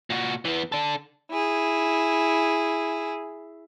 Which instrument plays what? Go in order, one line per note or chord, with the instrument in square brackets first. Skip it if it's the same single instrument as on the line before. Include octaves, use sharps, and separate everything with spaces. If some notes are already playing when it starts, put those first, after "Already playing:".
[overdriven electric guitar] A#2 F#4
E3 B3
D4 A4
[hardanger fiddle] E4 G#4